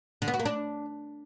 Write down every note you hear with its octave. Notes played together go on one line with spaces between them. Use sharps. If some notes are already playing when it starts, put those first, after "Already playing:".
D3
B3
F#4
A#3
D4